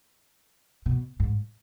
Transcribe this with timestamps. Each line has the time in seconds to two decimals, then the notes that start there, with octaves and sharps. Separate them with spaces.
0.86 B2
1.20 G#2